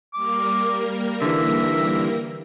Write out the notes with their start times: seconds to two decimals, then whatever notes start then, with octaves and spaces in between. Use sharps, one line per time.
0.14 G3 A#3 A#4 D6
1.22 D3 E3 E5